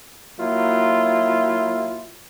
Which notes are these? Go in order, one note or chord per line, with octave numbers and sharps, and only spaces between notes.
F#3 A#3 E4 F4